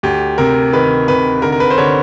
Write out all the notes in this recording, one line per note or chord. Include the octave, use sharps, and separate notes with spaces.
D2 G4
C3 A#4
D#3 B4
C3 B4
D3 A#4
A#4
B4
C5
D3 C#5